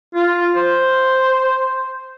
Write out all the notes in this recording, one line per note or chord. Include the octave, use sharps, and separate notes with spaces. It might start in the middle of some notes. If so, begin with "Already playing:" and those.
F4
C5